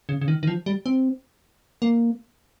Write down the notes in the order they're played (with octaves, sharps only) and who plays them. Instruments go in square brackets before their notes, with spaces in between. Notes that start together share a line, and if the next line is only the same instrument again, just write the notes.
[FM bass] C#3
C#3
D#3
D#3
F3
G3
C4
A#3